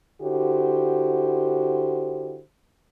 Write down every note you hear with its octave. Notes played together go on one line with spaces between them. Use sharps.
D3 E4 F#4 G4 C5